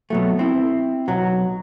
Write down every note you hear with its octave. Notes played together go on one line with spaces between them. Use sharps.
B2 F#3 A3
C4 E4
B1 F#3